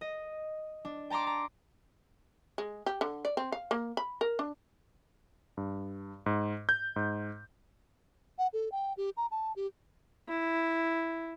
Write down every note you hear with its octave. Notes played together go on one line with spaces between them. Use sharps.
D#5
D4
G5 A5 A#5 C6 D6
A#5
G#3
G4
D3
D5
C4
F5
A#3
B5
A#4
D4
G2
G#2
G6
G#2
F#5
A4
G5
G4
A#5
A5
G4
E4